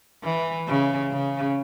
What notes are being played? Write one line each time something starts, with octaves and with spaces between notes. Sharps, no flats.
E3
C#3
C#3